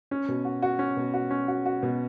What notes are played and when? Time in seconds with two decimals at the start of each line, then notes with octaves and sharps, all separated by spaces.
0.11 C#4
0.28 B2
0.45 F#4
0.63 F#4
0.79 C#4
0.97 B2
1.14 F#4
1.31 C#4
1.48 F#4
1.66 F#4
1.83 B2